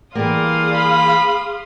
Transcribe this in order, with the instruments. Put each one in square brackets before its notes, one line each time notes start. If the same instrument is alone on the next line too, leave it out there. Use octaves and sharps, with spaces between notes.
[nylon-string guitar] E3 G3 A#3 [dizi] G#4 [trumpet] D5 [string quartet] F5 C6 D#6
[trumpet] B5